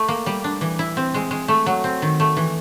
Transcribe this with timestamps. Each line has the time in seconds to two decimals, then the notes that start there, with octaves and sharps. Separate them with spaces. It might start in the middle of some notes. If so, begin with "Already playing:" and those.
Already playing: A3
0.08 A#3
0.26 G3
0.44 D4
0.61 E3
0.79 E4
0.97 C4
1.14 G#3
1.31 G#3
1.48 A3
1.66 F#3
1.84 C4
2.02 D#3
2.20 A3
2.37 E3